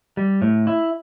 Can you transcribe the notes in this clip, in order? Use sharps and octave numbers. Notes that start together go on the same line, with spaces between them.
G3
A2
E4